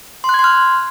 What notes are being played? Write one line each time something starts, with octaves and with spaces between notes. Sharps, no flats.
C6
F#6
G#6
C6
F6